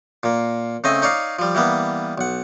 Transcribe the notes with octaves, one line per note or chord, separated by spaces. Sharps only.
A#2 A#3
C#3 A3 C4 D#5 G#5
D#4 C#5 D5 F5
F3 G3
E3 G3 A#3 B3
B1 F#5